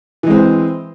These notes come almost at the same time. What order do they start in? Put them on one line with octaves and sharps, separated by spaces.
E3 G#3 C4